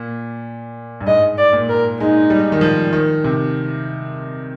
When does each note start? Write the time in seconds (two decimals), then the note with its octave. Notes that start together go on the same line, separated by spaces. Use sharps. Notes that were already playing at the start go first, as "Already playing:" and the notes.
Already playing: A#2
1.01 G2
1.07 G#2 D#5
1.38 D5
1.53 A#2
1.69 A#4
2.00 G#3 D#4
2.30 G3
2.52 D#3
2.61 F3
2.93 D#3
3.24 C3